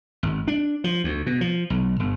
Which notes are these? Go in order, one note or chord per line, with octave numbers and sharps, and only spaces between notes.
G#1
D4
F3
D2
B2
F3
B1
G1